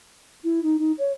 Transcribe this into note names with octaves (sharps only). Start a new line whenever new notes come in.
E4
D#4
D#4
C#5